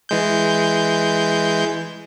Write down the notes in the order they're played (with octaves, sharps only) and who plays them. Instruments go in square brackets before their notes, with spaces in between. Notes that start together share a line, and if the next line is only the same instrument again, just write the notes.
[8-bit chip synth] E3 G#3 G6